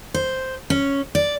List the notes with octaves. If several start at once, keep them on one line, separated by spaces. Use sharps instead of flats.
C5
C#4
D5